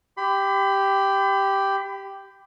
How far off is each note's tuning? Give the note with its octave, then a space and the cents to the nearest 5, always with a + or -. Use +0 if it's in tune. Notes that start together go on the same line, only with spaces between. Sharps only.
G4 +0 B5 +35